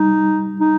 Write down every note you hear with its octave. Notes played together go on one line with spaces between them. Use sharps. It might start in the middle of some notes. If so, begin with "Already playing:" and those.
Already playing: G3 D#4
D#4